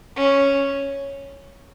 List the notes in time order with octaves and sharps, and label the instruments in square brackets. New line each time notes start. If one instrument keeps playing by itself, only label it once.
[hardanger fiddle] C#4